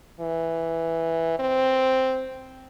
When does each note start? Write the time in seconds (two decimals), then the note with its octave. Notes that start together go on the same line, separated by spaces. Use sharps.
0.21 E3
1.39 C4